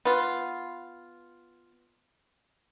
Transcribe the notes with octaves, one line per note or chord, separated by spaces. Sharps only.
B3 F4